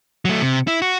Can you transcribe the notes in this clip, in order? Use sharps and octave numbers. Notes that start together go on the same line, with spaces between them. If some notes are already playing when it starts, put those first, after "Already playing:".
F#3 A3
C3
E4
F#4